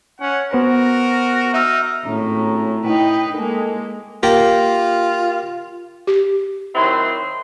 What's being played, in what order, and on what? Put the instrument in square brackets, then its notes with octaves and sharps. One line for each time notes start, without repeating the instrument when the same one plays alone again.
[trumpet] C#4 [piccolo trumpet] F#5
[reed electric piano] B3 C5 [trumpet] F#4 [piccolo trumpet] A#4
[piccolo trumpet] D#4 [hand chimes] E5 E6 F6
[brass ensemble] G#1 C#4 A#5 [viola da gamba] A2
[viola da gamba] D#4 B4 [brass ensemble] E4 G5
[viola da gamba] G#3 A#3 [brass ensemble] A4 G#5
[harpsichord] A#3 G4 A#5 [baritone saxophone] F4
[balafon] G4
[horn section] D#3 F#3 C4 E4 C6